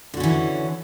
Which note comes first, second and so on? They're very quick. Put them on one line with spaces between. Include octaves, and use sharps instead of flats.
D3 F#4 C#4 E3